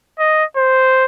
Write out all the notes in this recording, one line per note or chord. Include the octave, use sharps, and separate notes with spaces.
D#5
C5